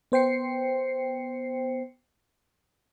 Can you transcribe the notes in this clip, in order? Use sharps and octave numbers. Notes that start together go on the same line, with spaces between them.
B3 C5 G5 C7 C#7